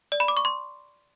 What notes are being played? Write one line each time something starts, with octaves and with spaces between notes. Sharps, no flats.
D5
B5
D6
C#6
C6